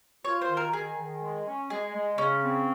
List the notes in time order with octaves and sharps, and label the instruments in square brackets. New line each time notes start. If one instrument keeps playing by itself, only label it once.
[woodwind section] F4 [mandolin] C#5
[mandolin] C5
[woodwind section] D#3
[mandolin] A#4
[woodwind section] D#3 [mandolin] G#4
[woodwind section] D#3
G#3
C#4
[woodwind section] G#3 [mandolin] G#4
[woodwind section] G#3
[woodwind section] C#3 [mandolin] C#4
[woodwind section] C4